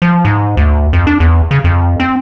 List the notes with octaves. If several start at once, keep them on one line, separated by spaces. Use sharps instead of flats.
F3
G#2
D2
F2
D4
E2
C#3
F2
C4